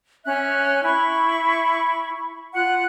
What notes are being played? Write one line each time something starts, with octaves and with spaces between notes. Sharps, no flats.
C#4 E5 F#6
E4 B5 C#6
F4 F#5 F#6